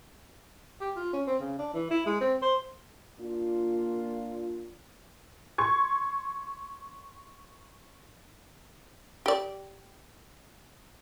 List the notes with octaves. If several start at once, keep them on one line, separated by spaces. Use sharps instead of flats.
G4
F4
C#4
C4
C#3
D4
E3
E4
G#3
C4
C5
A#2 A#3 D4 F4
C6 C#6 G#6
G4 D5